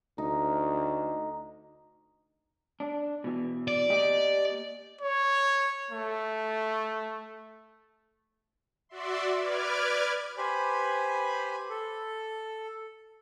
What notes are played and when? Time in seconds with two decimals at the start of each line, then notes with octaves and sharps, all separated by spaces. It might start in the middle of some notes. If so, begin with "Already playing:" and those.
0.18 D2 D#4
2.80 D4
3.24 B2 E3
3.68 D5
3.90 A#3 G4 D#5
5.01 C#5
5.91 A3
8.89 F#4 D5 E5 C6
9.39 B4 D5 D6 F6 G#6
10.38 G4 B4 C5 G#5 B5
11.70 A4